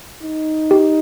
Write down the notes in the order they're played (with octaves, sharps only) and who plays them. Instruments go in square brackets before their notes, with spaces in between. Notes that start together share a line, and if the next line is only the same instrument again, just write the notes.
[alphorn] D#4
[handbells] G4